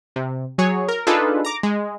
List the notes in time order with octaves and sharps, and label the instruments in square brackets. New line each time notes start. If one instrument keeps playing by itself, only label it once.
[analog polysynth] C3
F#3 G#4 C#5
A#4
D4 D#4 F4 G#4 A4 B4
A#5 D6
G#3